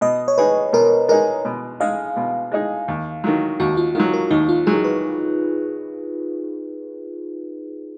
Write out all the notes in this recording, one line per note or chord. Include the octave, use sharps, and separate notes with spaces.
B2 D#5
C#5
G#3 D#4 G#4 B4
B2 A#4
G#3 D#4 G#4 A#4
B2
G#3 D#4 G#4 F5
B2
G#3 D#4 G#4
D#2
D#3 F#3
D#2 F#4
F4
D#3 F#3 F4
A#4
D#2 D#4
F4
D#3 F#3 G#4
B4